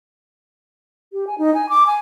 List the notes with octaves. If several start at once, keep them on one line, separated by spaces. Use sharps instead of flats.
G4
G#5
D#4
G#5
D6
G#5